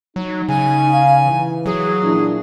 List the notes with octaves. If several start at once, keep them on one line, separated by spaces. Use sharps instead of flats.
F#3 D#4
C#3 G#5
F5
E3
F#3 G#4
A#2 D4 E4